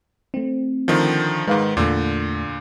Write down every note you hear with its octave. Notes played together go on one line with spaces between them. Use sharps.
A3 C4
D3 D#3 F3
G#2 D#3 G#3 B4 F5
E2 A#2 D3 A3